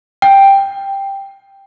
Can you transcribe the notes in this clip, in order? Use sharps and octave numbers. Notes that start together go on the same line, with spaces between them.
G5